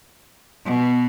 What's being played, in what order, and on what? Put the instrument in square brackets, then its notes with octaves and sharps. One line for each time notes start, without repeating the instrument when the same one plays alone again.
[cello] B2